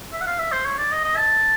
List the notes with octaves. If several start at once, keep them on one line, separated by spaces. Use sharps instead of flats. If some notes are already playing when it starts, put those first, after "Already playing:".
E5
F#5
F5
E5
C5
C#5
D5
D#5
D#5
A5